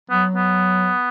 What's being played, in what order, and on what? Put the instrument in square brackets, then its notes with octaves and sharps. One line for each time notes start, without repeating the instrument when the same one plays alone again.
[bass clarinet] F#3 [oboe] B3
[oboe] B3